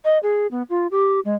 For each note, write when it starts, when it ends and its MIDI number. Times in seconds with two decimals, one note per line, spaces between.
0.05 0.18 75
0.23 0.47 68
0.51 0.63 59
0.70 0.87 65
0.91 1.20 67
1.25 1.35 56